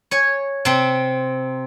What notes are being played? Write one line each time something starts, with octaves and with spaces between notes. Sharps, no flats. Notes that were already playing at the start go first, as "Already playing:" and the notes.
C#5 G#5
C3 C4